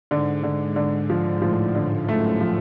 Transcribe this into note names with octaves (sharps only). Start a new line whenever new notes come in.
G#2 D3
D3
D3
F3
A2 F3
G#2 D3
F#2 A3
F3